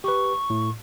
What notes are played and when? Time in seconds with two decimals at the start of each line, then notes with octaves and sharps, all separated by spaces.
0.04 G4 B4 C#6
0.50 A2